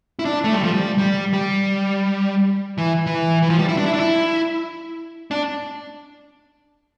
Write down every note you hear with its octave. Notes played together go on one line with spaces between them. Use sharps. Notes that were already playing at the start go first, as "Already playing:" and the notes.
E4
D4
A3
G3
F3
G3
G3
G3
E3
E3
E3
F3
G3
E4
D4
E4
D4
E4
D4